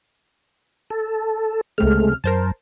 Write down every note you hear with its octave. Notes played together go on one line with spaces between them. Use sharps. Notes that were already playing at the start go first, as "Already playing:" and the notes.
A4
C#2 C3 G#3 A3 F6
F#2 A#4 C5 A5